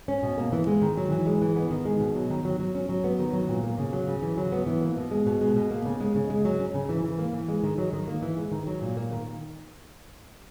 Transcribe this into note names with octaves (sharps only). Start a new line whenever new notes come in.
C#4
B2
A#3
E3
G#3
D#3
F#3
E3
G#3
E3
B3
D#3
G#3
B2
F#3
D#3
F#3
F#3
C#4
F#3
B3
D#3
F#3
A#2
A#3
C#3
F#3
C#3
E3
F#3
B3
E3
A#3
B2
G#3
B2
G#3
B2
A#3
C#3
G#3
C#3
G#3
F#3
C#4
C#3
E3
E3
A#3
E3
G#3
D#3
F#3
D#3
A#3
E3
G#3
D#3
F#3
A#2
A#3
D#3